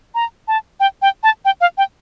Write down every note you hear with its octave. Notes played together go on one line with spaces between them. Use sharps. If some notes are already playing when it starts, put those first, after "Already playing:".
A#5
A5
G5
G5
A5
G5
F5
G5